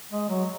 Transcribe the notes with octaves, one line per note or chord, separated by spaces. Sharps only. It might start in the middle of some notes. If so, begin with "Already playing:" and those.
G#3
F#3